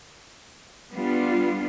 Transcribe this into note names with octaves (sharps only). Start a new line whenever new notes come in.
G3 B3 D4 F4